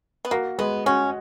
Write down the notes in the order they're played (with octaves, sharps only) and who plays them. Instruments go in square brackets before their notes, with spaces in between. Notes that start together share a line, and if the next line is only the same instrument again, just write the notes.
[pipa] B3
[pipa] A#3 [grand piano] F#4
[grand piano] G#3 [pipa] B3
[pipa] C#4 [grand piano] F#4